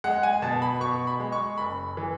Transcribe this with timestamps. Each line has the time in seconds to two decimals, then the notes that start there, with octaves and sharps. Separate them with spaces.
0.04 G#3 F#5
0.23 G#5
0.42 B2 A5
0.62 B5
0.80 B2 C#6
1.07 B5
1.20 G#3
1.32 C#6
1.58 F#1 B5
1.97 E3